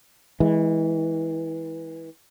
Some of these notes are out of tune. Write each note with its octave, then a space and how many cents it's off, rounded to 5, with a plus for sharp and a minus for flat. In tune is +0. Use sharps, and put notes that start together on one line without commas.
E3 -20 G#3 +0